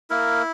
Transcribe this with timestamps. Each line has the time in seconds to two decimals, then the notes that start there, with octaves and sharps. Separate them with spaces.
0.10 A#3 E4 A#4